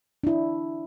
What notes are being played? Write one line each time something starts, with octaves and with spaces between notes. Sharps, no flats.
D4 E4